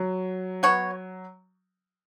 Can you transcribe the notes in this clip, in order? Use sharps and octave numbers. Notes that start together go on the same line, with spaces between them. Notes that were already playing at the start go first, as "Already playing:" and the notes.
Already playing: F#3
B3 F#4 C#5